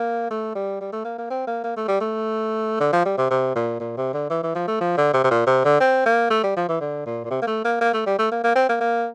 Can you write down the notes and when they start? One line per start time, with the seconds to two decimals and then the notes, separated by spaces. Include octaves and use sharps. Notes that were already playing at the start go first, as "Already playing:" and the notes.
Already playing: A#3
0.31 A3
0.55 G3
0.81 G3
0.93 A3
1.05 A#3
1.18 A#3
1.30 C4
1.47 A#3
1.64 A#3
1.77 A3
1.88 G3
2.01 A3
2.80 D3
2.93 F3
3.05 G3
3.18 C3
3.30 C3
3.55 A#2
3.80 A#2
3.97 C3
4.14 D3
4.30 E3
4.43 E3
4.55 F3
4.68 A3
4.81 F3
4.97 D3
5.14 C3
5.24 C3
5.31 A#2
5.47 C3
5.65 D3
5.81 C4
6.06 A#3
6.30 A3
6.44 G3
6.57 F3
6.69 E3
6.81 D3
7.06 A#2
7.25 A#2
7.31 C3
7.42 A#3
7.47 A3
7.65 A#3
7.81 A#3
7.94 A3
8.06 G3
8.19 A3
8.32 A#3
8.44 A#3
8.56 C4
8.69 A#3
8.81 A#3